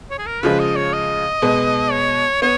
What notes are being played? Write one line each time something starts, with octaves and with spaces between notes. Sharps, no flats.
C#5
G#4
A#4
C#3 F3 G#3 B4
D#5
C#5
D#5
B2 G#3 B3
C#5
B3 C#5